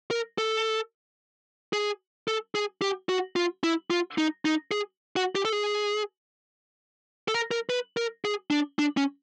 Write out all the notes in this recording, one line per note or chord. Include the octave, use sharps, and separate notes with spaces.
A#4
A4
G#4
A4
G#4
G4
F#4
F4
E4
F4
D#4
D#4
G#4
F#4
G4
A4
G#4
A4
A#4
A#4
B4
A#4
G#4
D4
D4
C#4